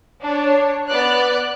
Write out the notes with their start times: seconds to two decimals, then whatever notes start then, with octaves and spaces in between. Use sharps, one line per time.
0.22 D4 C#5
0.88 B3 D5 F#6